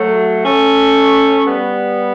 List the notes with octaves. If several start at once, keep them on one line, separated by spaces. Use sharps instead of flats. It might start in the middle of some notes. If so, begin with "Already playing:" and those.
Already playing: F#3 A3
A3 C#4
G3 B3